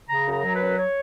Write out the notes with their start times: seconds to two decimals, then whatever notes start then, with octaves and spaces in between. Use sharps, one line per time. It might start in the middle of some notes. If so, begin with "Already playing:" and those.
0.09 C#3 A#5
0.26 F#2
0.32 A#5
0.44 F#3
0.55 B4
0.61 F#2
0.78 C#5